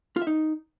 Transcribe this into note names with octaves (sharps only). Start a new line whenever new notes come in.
F4
E5
D#4